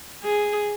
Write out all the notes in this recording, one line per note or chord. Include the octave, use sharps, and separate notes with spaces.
G#4